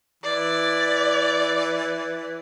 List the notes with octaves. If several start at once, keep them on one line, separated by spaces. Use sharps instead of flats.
E3 D5